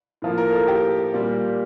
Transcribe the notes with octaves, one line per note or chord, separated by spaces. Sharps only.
A2 F3 A#3
A#4
A4
G4
A#2 G3 A#3